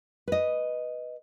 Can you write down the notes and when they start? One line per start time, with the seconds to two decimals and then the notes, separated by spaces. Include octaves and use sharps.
0.28 B4 D#5